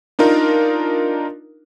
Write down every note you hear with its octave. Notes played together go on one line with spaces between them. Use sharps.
D4 D#4 F4 A#4